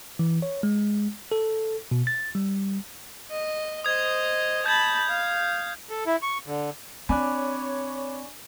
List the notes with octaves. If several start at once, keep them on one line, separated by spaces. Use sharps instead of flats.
E3
C#5
G#3
A4
B2
A6
G3
D#5
C5 D#5 D#6 G#6
A5 B5 G6 G#6
F5
A4
E4
C#6
D3
C4 D4 C#5 G#5 B5 D6 F#6